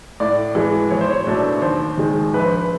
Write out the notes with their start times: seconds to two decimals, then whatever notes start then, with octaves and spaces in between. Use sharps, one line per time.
0.20 A2 D5
0.55 E3 G#3
0.90 E2 C#5
1.01 C5
1.10 C#5
1.26 B2 F#3 A3 D4
1.62 D#2 C5
1.97 D#3 G#3
2.33 A#1 B4
2.45 C5
2.55 B4